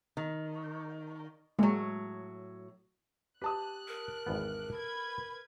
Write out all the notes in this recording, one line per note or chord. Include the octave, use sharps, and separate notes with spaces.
D#3
A2 F#3 G#3 A#3
G4 B4 A5 D#6 F#6
A#4
G#1 E2 B3
A4 B4 B5 G#6